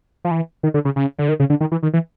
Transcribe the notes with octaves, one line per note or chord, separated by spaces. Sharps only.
F3
E3
D#3
D3
C#3
C#3
D3
D#3
C#3
D3
D#3
E3
D#3
E3